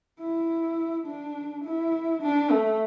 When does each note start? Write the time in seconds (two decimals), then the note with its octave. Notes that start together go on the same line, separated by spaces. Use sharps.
0.20 E4
1.07 D4
1.64 E4
2.22 D4
2.51 A3